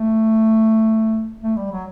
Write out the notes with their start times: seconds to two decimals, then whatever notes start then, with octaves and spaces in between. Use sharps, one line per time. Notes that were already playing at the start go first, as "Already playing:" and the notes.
Already playing: A3
1.42 A3
1.56 G3
1.71 F#3